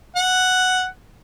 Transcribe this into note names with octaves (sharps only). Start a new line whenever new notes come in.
F#5